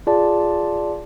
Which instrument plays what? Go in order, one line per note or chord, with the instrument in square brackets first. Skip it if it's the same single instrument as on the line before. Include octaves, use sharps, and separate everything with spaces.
[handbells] F4 G#4 D5 A5